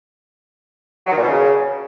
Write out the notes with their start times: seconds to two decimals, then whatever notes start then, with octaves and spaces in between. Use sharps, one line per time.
1.07 F#3
1.12 D#3
1.17 A#2
1.23 B2
1.28 C#3